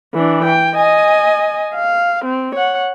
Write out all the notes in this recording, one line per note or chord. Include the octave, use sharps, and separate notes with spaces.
E3 D4
G5
D#5 G#5
F5
C4
C#5 F#5